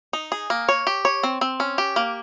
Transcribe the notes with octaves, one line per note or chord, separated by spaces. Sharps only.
D#4
G#4
A#3
C#5
G4
C#5
C4
C4
C#4
G4
A#3